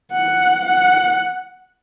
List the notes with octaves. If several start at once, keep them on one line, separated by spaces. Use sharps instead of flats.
F#5
F#5